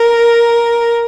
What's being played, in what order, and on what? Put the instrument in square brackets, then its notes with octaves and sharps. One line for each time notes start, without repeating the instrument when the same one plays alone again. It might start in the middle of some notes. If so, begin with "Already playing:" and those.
Already playing: [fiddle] A#4